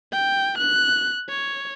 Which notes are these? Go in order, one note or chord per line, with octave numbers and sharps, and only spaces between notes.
G5
F#6
C#5